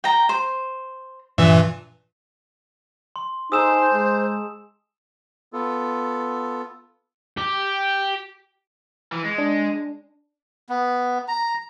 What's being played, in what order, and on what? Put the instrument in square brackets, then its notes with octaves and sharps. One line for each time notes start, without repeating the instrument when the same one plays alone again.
[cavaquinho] G5 A#5
C5
[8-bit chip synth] G2 A#2 E3 [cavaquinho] E5
[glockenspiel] C6
[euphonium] D#4 [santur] G#4 A4 A#5 [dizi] C5 [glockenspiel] D#6 E6 E7
[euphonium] G#3
[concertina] B3 F4 A4
[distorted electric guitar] G4
[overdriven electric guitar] E3
G#3
[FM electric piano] D4
[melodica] B3
A#5